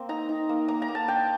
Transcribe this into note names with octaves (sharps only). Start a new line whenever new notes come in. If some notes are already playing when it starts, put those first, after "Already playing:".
Already playing: A#3 C4 C6
D#4 A#5
D#4
A#3
A#3 A#5
A#5
A#3
A5
D4 G5